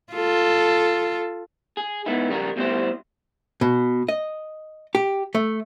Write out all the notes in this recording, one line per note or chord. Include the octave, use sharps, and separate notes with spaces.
F4 A4
G#4
G#3 B3 D#4 E4
F2 C#3 G3 A4 A#4
D2 B2 G3 C4 E4 C5
B2
D#5
G4
A3